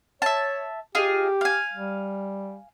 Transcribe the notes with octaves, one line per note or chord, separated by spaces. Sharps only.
C#5 E5 A5
F4 G4 G#4 D#5
F5 G#5
G3